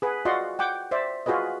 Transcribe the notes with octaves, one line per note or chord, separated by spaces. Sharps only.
G#4 B4 F#5
F4 F#4 D5 D#5 F#5 C6
F#5 G5 D6
C5 D5 E5
F4 F#4 G#4 B4 D#5